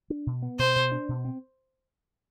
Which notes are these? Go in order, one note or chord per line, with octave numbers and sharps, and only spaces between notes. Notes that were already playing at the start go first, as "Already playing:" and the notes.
D4
B2
B3
B2 C5
B2
D4
B2
C4